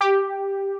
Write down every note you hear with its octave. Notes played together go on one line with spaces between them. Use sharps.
G4